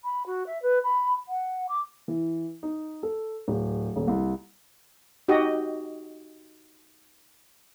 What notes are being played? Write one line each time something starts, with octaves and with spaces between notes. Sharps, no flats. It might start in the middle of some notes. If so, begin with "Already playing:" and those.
B5
F#4
E5
B4
B5
F#5
D6
E3
D#4
A4
D1
D#1
C2
D#4 F#4 G4 D#5